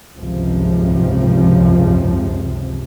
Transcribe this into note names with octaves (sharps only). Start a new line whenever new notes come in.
G#1 C#2 F#2 C3 F3